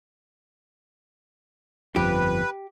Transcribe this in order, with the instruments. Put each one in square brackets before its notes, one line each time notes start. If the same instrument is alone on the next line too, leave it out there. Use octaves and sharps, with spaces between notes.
[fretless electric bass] G1 F2 F3 [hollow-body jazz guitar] G4 [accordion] B4